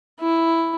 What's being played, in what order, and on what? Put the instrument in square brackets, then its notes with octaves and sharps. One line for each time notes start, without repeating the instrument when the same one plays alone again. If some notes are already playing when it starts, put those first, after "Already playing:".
[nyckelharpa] E4